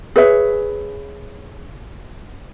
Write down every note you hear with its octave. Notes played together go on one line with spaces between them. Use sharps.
G#4 B4 C#5 E5